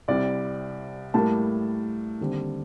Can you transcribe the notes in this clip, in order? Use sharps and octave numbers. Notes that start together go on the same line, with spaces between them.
C2 C3 G3 D5
A2 G3 A#3 A5
D#2 D3 G3 C4